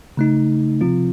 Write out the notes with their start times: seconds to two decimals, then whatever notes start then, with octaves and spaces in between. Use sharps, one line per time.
0.17 C#3 A3 D#4
0.81 C3 F3 C4 F4